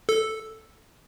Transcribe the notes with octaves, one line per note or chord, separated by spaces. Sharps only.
A4